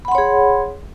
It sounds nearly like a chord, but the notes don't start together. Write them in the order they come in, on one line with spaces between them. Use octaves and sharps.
B5 F#5 C6 C#5 G#4